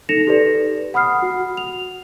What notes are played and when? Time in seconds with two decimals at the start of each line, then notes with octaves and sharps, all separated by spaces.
0.09 D#4 A4 A#6 C#7 E7 F7
0.27 G4 A4 B4 D5
0.94 F#5 B5 D#6 F6 C7
1.19 F#4 F#5
1.57 F7